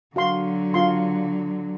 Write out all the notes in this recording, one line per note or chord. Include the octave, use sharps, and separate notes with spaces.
D3 F#3 F#4 F5 C6
F4 C6